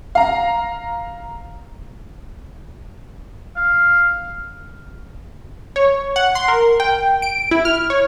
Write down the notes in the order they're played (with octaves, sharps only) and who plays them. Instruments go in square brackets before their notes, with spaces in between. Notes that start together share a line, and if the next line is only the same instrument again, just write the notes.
[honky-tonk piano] F5 A#5
[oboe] F5
[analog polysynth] C#5
F#5
C6
A#4
G5
D7
E4
F6
C#5